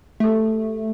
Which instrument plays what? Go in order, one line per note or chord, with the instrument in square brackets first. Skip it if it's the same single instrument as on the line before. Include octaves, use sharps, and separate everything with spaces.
[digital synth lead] A3 [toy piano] G4 A4